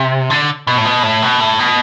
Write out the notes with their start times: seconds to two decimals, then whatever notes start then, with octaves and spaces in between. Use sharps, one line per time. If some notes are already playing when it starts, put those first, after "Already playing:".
Already playing: C3
0.30 D3
0.67 B2
0.78 A2
0.85 B2
1.03 A2
1.22 B2
1.41 A2
1.59 B2